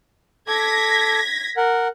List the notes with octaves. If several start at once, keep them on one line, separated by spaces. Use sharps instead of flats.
A4 D6 G#6 A#6 B6
A#4 F#5